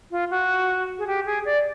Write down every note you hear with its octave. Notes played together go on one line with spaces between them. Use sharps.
F4
F#4
G#4
G4
G#4
D5